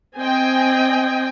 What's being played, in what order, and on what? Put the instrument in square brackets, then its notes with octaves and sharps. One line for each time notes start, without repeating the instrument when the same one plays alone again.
[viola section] C4 D#5 G5 G#5